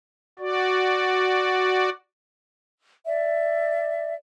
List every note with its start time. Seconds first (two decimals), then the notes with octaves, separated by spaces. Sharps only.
0.39 F#4 D5
3.05 D5 E5